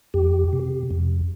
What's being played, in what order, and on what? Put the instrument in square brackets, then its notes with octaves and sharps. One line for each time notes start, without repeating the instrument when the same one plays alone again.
[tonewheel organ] F2 G4
C3
F2